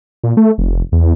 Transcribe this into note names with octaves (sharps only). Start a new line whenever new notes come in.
A#2
A3
F1
E2